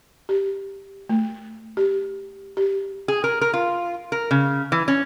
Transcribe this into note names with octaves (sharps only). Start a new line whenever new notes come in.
G4
A3
G4
G4
G#4
A#4
A#4
F4
A#4
C#3
E3
C#4